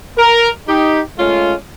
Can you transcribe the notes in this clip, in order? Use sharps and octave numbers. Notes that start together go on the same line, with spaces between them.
A#4
D#4 G4
G#3 A3 C#4 F4